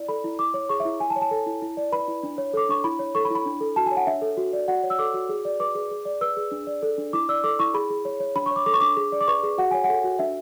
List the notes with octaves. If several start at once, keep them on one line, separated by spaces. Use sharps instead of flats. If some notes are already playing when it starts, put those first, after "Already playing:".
Already playing: E4 D5
A4 B5
E4
E4 D6
C#5
G#4 C#6
E5
E4
E4 G#5
A5
C#5
A5
A4
E4
E4
D5
B4 B5
E4
D4
C#5
A4 D6
D4 C#6
E4 B5
C#5
A4 C#6
B5
E4
B5
D4
A4
F#4 A5
G#5
C#5
F#5
D4 E5
A4
F#4
D5
F#4 F#5
C#5
E6
A4 D6
F#4
G#4
D5
B4 D6
G#4
G#4
D5
B4 E6
G#4
D4
D5
A4
D4
E4 D6
D5 E6
A4 D6
E4 C#6
G#4 B5
G#4
C#5
C#5
D4 B5
C#6
C#5
D6
A4 D6
C#6
D4 D6
G#4
D5
D6
B4 C#6
G#4
F#4 F#5
C#5 G#5
F#5
A4
F#4
D4 E5